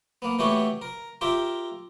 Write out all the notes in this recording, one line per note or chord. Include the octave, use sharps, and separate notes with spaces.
A#3 B3
E3 A3 B3 F#4 G4 C#5
A#4
F4 G4 A#4 E5